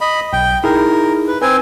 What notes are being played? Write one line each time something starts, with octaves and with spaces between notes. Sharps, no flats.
D#5 B5
B1 G5
D#4 E4 G#4 A#4
B4
C4 B4 G#5